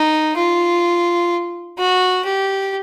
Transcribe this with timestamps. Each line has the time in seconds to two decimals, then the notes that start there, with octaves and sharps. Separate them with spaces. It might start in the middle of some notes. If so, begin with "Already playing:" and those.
Already playing: D#4
0.37 F4
1.79 F#4
2.25 G4